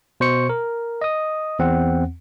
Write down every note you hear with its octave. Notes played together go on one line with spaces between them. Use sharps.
B2 C5 C#6 C#7
A#4
D#5 D#6
E2 C4 F#5